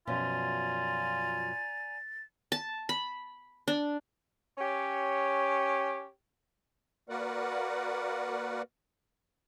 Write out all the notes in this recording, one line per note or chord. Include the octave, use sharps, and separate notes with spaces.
F#2 B2 F3 F4 D5 G#5 A#5 A6
A5
B5
D4
C#4 G4 C#5
A#3 F#4 A#4 B4 D5 F#5